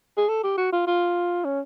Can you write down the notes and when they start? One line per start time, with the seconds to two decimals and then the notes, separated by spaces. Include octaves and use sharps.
0.17 G#4
0.28 A4
0.43 G4
0.57 F#4
0.72 F4
0.87 F4
1.45 C#4